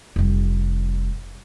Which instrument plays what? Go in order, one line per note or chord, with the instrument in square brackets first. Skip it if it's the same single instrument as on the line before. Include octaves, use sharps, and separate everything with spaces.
[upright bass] F1 G3